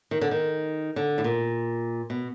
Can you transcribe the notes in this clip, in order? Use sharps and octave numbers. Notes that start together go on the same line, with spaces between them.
D#3
D3
D#3
D3
A2
A#2
B2